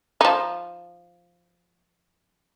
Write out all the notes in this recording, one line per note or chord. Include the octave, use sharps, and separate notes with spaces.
F3 D#4